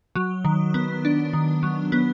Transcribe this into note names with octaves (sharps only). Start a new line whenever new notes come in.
F#3
D#3
B3
D4
D#3
F#3
B3